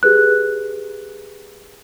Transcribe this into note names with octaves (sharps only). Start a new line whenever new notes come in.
G4 G#4 B4 F#6